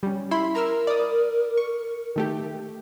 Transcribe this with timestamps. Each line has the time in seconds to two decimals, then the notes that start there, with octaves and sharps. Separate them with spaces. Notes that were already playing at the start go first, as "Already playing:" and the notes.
0.03 G3 C#4
0.31 E4 B5 C6
0.55 A#4 A#5 E6 F6
0.87 D5 D#6
1.58 C#6
2.16 D#3 A3 G4